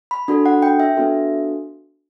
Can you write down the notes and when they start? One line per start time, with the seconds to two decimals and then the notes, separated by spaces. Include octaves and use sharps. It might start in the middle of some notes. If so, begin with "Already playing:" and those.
0.11 B5
0.28 D4 F#4 A4 B5
0.46 F#5
0.63 G5
0.80 E5
0.97 B3 D4 F#4 A4